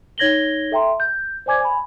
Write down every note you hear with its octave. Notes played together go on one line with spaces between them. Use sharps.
D#4 C#5 G#6 A#6 F#7 G7
A4 E5 G5 A#5 C6
G6
C5 D5 G#5 D6 G#6
G#5 B5